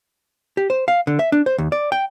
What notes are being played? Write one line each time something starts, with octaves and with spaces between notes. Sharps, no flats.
G4
C5
F5
D3
E5
D4
C5
D#2
D5
G5